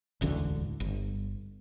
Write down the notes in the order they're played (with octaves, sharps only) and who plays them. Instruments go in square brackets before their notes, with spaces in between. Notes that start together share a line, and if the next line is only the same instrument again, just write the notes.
[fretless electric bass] E1 A1 D2 D3
G1